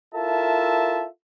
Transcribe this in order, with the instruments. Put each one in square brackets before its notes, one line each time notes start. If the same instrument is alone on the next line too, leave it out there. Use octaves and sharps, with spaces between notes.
[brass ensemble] E4 F4 A4 A#4 E5 A5